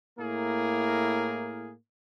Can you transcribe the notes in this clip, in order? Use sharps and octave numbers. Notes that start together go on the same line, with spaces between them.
A2 A#3 E4 G#4 A#4